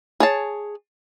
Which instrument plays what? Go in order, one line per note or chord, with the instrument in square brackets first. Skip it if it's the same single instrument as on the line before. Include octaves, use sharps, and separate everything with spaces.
[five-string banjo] G#4 C#5 A5